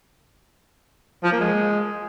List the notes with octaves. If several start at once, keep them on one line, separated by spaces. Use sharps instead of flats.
F3
A#3
G#3